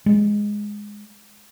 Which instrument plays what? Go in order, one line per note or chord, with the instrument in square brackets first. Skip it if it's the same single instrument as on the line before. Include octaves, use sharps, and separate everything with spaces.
[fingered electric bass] G#3